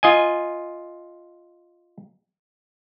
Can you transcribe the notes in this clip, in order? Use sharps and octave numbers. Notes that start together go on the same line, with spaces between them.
F4 D#5 G#5